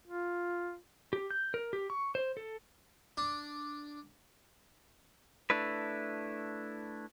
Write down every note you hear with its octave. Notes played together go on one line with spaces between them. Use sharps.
F4
G4
G6
A#4
G4
C#6
C5
A4
D4
A3 D4 E4 B4